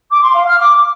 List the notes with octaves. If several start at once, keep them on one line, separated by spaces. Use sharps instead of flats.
D6
C6
F5
F6
D6